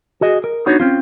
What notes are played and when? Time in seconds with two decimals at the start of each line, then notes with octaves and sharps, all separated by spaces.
0.21 F#4 G#4 D#5
0.44 A#4
0.66 B3 D4 D#4 F#4 C#5
0.80 C4 C#4 F4